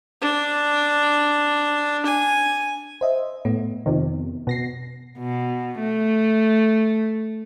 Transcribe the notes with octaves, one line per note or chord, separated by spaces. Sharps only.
D4
G#5
C5 D#5 E5
A2 B3
F2 C3 D#3
B2 A#6 C7
B2
A3